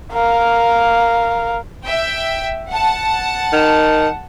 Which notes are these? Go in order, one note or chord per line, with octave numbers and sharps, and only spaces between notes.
A#4 F5
E5 G5
F#5 A5
D#3